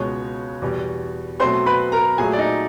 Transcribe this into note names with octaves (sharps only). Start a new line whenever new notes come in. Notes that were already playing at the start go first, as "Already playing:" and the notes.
Already playing: C#2 B2 G#3 C#5 C#6
E2 B2 G3
B2 F#3 A3 C4 C5 C6
B4 B5
A#4 A#5
A#2 F#3 A3 G#4 G#5
D5
D#4 D#5